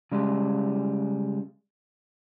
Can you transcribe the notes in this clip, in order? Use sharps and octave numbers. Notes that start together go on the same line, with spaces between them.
C#3 G3 G#3